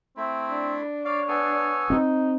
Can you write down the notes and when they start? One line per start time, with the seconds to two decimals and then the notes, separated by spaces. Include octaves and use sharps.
0.17 A3 C4 E4
0.51 D4
1.05 C#5 D5 F5
1.28 B3 A4 G#5
1.90 C4 D#4